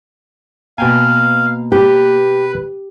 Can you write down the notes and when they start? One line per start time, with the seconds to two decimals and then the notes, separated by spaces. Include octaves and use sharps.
0.78 B2 A#3 F5 G5 G#5
1.72 G4 B4